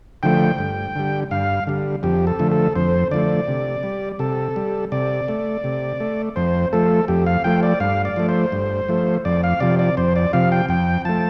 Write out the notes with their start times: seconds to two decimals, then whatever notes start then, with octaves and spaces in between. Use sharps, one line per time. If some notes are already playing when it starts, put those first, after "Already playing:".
0.23 D3 F3 A3 G5
0.58 G2
0.96 D3 G3
1.31 G2 F5
1.67 D3 G3
2.03 F2 G4
2.27 A4
2.39 D3 F3 A3
2.52 A4
2.75 F2 C5
3.11 D3 F3 A3 D5
3.47 C3
3.83 G3
4.19 C3 A4
4.56 G3
4.92 C3 D5
5.28 A3
5.64 C3
6.00 A3
6.36 F2 C5
6.73 F3 A3 A4
7.08 F2 G4
7.27 F5
7.44 F3 A3 G5
7.63 D5
7.80 G2 F5
8.05 D5
8.16 F3 A3
8.29 C5
8.52 G2
8.88 F3 A3
9.25 F2 D5
9.44 F5
9.60 C3 F3 D5
9.79 D5
9.97 F2 C5
10.16 D5
10.33 C3 F3 F5
10.52 G5
10.69 F2 G5
11.05 F3 A3 A5